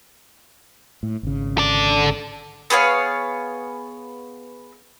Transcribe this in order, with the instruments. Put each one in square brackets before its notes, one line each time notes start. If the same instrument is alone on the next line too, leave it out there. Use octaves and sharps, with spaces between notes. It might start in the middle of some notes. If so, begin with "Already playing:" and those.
[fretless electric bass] A2
G#1 C#3
[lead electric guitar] A4 D5
[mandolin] B3 G#4 C#5 F5